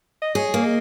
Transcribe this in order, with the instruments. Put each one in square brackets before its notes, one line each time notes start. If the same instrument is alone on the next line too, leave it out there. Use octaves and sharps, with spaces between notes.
[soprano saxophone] D#5
[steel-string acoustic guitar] G#4 [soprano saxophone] C#5
[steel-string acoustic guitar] A#3
[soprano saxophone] D#5